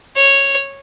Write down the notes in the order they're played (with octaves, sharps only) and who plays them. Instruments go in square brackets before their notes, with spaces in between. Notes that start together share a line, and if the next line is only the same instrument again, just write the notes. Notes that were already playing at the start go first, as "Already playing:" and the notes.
[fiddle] C#5